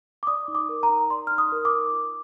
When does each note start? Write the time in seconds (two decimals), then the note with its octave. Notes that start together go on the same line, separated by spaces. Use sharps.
0.23 D6
0.27 D5 D#6
0.48 D#4
0.55 D6
0.69 A#4
0.83 A#5
0.89 D#4
1.10 D5 C6
1.27 D#4 F6
1.38 D#6
1.52 A#4
1.65 D6
1.73 D#4
1.93 F4